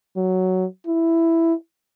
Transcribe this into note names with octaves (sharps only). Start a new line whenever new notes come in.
F#3
E4